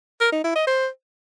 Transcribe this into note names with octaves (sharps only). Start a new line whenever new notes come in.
A#4
D#4
E4
D#5
C5